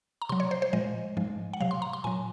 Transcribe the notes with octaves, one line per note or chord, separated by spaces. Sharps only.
A#5
C3 F#3 C6
C#5
C5
C5
A#2 F3 G#3 D#5
G#2 F3 G#3
F#5
C3 F#3 F5
C6
A#5
C6
A#2 F#3 G#5